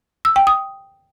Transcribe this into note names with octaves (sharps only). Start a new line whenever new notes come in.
E6
G5
D#6